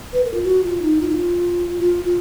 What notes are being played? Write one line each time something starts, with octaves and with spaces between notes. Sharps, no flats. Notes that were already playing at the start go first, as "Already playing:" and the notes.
B4
A#4
F4
F#4
F4
D#4
F4
D#4
F4
F4
F4